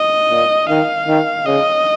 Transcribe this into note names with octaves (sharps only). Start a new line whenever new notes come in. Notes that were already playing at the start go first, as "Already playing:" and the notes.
Already playing: D#5
A#2
D#3 F5
D#3
C#3 D#5